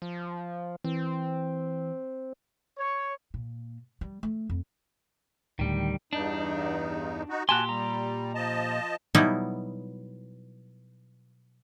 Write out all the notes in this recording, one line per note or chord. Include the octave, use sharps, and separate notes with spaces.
F3
E3 C4
C#5
A#2
G3
A3
F2
D1 D2 D#3 G3
E2 G2 D4 D#4
D#4 F#4
A#2 F#4 G4 G#5 A5 C6 F#6
G3 A#5
F3 D#5 A5
B2 F#3 G3 B3 D#4 E4